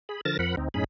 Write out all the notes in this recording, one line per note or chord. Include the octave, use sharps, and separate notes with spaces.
G#4 B5
D3 F3 A#4 A5 A6 A#6
F2 F3 A#4 F#5 B5
D2 C4 D#4
F#2 A2 C#4 D#4 G#4 B5